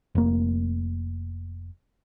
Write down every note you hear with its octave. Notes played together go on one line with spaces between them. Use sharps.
F1 A#3